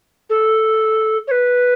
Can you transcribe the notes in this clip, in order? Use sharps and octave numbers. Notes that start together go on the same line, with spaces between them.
A4
C#5
B4